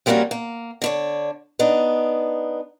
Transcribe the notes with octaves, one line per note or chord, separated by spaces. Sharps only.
F3 G3 A#3 B3 C#4 F#4
A#3
D3 D4 C#5
B3 D4 D#4